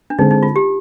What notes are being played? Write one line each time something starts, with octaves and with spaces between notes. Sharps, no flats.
D4
D3 G#3 C4 D#4
D#4
F4
G4